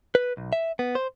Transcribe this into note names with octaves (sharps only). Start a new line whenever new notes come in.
B4
B1
E5
B3
C5